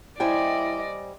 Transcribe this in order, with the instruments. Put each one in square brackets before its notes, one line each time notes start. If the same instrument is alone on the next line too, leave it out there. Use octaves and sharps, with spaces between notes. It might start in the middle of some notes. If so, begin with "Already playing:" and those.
[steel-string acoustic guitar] G3 C5 G#5 [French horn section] E4 [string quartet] D5 D#5 [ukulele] G5